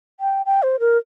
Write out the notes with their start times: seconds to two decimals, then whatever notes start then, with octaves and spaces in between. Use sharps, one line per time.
0.20 G5
0.46 G5
0.63 C5
0.80 A#4